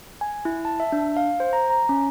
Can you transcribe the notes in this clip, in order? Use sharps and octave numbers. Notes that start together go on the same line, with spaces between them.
G#5
E4
A5
E5
D4
F5
C5
A#5
A#5
C#4